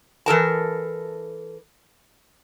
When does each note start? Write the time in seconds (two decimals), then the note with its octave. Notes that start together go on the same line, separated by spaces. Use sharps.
0.26 E3 A4 A#4 A5